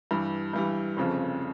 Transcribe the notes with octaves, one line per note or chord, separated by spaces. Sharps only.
G2 E3 G3
G2 E3 G3
F1 F2 C#3 F3